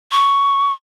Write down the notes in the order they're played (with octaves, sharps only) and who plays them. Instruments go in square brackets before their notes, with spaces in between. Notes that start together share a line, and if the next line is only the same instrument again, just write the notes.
[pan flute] C#6